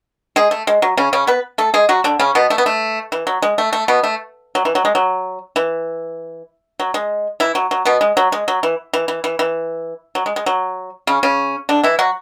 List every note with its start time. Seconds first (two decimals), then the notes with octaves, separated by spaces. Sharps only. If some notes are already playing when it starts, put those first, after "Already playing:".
0.36 G#3 G#4
0.51 A3
0.67 G#3
0.82 F#3
0.97 C#3 C#4
1.13 C#3 C#4
1.27 B3 B4
1.58 A3 A4
1.74 G#3 G#4
1.89 F#3 F#4
2.04 D3 D4
2.19 C#3 C#4
2.35 B2 B3
2.50 A3
2.58 B3
2.66 A3
3.12 E3
3.27 F#3
3.42 G#3
3.58 A3
3.73 A3
3.88 B2 B3
4.04 A3
4.55 F#3
4.65 E3
4.75 F#3
4.85 G#3
4.95 F#3
5.56 E3
6.80 F#3
6.94 G#3
7.40 E3 E4
7.55 F#3
7.71 F#3
7.85 B2 B3
8.01 G#3
8.17 F#3
8.32 G#3
8.48 F#3
8.63 E3
8.94 E3
9.08 E3
9.24 E3
9.39 E3
10.15 F#3
10.26 G#3
10.36 G#3
10.46 F#3
11.07 C#3 C#4
11.23 C#3 C#4
11.69 D3 D4
11.84 E3 E4
11.99 F#3 F#4